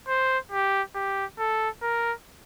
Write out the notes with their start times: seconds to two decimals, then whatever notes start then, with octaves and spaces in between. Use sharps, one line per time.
0.08 C5
0.52 G4
0.95 G4
1.39 A4
1.82 A#4